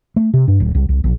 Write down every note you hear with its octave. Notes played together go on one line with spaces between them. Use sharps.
A3
C3
G2
D1
C2
C2
A#1